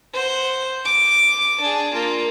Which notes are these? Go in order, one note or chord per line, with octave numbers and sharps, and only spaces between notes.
C5 F#5
D6
D4 G#4
A#3 F4